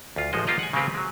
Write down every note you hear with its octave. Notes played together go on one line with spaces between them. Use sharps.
D2 F4
A1 F3 G#3 F#4 D#5
A#3 F4 G4 D#5 A#5
F#5 G#5
C#3 G#3 A#3 C4 G4 B4
F#3 G#3